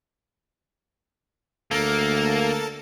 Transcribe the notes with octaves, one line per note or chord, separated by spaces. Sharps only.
D2 A#3 A4 A#4 A5